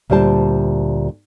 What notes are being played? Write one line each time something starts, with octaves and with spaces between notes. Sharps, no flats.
D2 A#2 G3 C5 A5